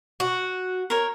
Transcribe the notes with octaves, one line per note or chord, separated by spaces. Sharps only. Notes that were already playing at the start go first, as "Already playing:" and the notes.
F#4
A#4 C#5